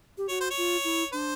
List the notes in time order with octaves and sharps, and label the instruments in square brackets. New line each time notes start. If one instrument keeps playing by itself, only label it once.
[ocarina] G4
[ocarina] F#4 [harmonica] C#5
[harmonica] C5
C#5
[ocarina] F4
E4
[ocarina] D4 [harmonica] C5